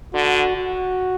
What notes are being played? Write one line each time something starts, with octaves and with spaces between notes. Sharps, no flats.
D3 F#4
F#4